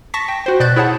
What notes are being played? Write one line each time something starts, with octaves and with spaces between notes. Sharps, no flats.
A5 C#6 A#6 B6
G5
F#4 C5
B2 D5 F#6 G6 A6
E4 G#4 C#5 F#5 A5